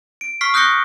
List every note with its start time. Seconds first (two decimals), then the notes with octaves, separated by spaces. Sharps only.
0.21 D7
0.41 C#6 F6 B6 C7
0.54 D#6 F#6 G6 A#6 C#7 G7